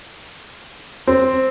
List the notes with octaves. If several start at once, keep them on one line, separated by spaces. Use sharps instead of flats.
C4